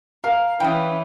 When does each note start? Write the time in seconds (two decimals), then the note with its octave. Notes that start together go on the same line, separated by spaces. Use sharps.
0.24 A#4 F5
0.60 E3 C#4 B4 G5 D#6